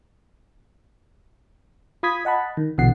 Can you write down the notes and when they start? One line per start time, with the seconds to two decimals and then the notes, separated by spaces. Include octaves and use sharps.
2.03 F4 B5 D#6 G#6 B6
2.25 D#5 F#5 A5 B5
2.57 D#3
2.78 A#1 B2 D3 E3 F#5 C7